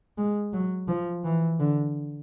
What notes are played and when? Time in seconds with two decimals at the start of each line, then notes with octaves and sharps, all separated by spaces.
0.18 G#3
0.53 F#3
0.88 F3
1.24 E3
1.60 D3